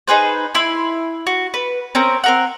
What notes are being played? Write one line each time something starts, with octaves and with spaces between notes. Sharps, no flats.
D#4 G#4 B4 C5
E4 B5 C6
F#4
B4
C4 C#4 A#4
C4 A#4 F#5